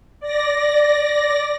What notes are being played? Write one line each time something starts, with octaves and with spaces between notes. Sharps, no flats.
D5 A#6